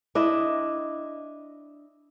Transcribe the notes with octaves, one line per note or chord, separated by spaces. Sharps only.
D4 E4 D#5